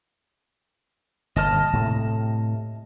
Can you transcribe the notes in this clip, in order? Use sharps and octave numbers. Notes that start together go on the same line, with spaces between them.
G1 A#2 D#5 A5 F6
A2 C3 A3